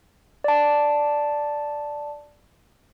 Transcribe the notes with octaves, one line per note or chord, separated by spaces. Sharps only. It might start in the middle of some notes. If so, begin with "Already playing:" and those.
D5 A5